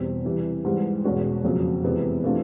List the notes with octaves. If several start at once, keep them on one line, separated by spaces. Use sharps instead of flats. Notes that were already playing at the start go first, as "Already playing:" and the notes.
Already playing: E2 B2 G3 C4
C3 E3 G3
G#2 E3 G3
E2 B2 G#3 C#4 F#4
F2 C#3 F#3 A#3
E2 C3 E3 G#3 B3
C3 E3 A3 D4 F4